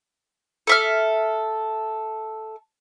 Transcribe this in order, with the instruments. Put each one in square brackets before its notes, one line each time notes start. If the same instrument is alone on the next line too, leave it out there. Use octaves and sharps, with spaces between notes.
[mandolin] A4 E5 F6